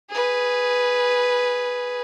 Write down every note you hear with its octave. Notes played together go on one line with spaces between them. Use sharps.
G#4 B4